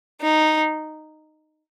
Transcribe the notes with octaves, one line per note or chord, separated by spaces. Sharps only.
D#4